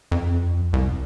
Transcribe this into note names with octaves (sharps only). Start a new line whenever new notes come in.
F2
C2